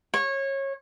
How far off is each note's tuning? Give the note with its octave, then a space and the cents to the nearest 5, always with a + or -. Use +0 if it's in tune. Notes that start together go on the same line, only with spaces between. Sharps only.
C#5 -25